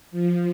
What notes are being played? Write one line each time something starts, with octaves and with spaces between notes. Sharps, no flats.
F3